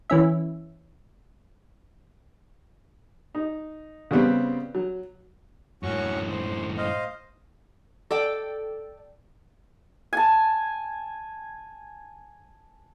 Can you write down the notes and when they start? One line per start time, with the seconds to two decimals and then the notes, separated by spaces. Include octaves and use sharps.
0.10 E3 C#4 E5
3.35 D#4
4.11 C#3 G3 B3 C4
4.75 F#3
5.83 F#2 A2 C#4 F#4 C#6
6.29 C5
6.77 C5 D#5 F5
8.11 A4 D5 G5
10.13 G#5 A5